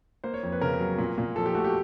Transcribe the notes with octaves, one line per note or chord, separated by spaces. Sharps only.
A#3 C5
C#5
F2
B4
C#3 A#4
F#3
A#2
A#2
F3 A4
G4
A3 F#4
G4